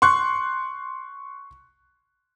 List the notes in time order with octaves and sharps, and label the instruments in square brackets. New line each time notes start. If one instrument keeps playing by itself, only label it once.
[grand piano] C6 C#6 F#6